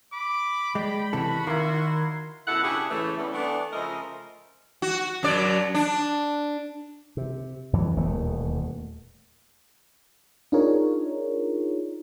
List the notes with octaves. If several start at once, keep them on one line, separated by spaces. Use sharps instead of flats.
B5 D6
G#3 D5 G5
C3 E3 F#4 A4
D#3 A#3 E4 C6
F#2 B2 E4 A4 F#5
C#3 D4 E4 G4 G#4
A2 C#3 E3 A3
E3 G3 A3 B3 C#4 D4
E3 A3 B3 D4
C#3 F3 A3 A#4 D#5
F#4
F#2 F#3 D5
D4
C3
F2 E3
D#1 E2 B2 A3
D4 D#4 F4 G#4 A#4 C#5